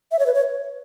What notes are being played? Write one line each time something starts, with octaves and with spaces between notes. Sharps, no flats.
E5
C#5
B4
C#5